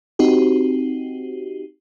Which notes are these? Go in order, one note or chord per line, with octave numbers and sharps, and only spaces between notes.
C4 D#4 F#4 G4